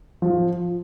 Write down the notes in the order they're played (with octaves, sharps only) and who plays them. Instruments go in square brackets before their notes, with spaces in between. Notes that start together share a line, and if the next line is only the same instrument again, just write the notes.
[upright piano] F3